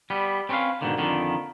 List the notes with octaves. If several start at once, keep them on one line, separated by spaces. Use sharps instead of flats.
G3 B3
C4 C#4 A4 B4 F5
G#2 B2 D3 D#3 A#3
F2 D3 D#3 A#3 B3